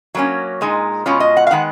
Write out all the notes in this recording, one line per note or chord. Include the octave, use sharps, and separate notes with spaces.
F#3 A#3 C#4
A#2 G#3 D#4
B2 G#3 C#4 F4 C#5
D#5
F#5
F5
D#3 G#3 B3 F#5